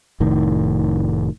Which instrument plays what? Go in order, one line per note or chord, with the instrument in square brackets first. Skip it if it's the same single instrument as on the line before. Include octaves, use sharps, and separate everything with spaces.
[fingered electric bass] F1 A2 D#3